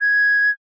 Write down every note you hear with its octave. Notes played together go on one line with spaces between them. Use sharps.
G#6